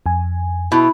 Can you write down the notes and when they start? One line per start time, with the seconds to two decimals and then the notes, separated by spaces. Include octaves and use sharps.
0.06 F2 G#5
0.72 B2 E4